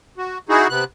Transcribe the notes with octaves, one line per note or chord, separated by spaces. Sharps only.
F#4
D#4 E4 F#4 G#4
C3 B3 F#6